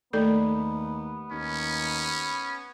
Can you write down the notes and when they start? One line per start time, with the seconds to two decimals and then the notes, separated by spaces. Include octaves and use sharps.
0.13 D#2 A3 B3 A4 D5
1.32 D#2 C#4